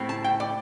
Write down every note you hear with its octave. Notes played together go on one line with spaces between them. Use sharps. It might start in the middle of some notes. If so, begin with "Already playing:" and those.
Already playing: A2 G3 C4
A5
G5
D5